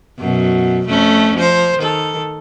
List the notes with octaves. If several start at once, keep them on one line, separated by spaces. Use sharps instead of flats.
F#2 B2
F2 A3 C#4
F3 C5
D#3 A4